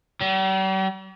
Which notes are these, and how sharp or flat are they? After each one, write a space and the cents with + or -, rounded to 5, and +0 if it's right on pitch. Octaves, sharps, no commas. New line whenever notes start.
G3 -45